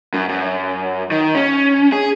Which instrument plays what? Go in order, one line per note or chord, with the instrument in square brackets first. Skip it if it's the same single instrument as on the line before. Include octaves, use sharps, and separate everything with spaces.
[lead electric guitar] F#2
F#2
D#3
C#4
G#4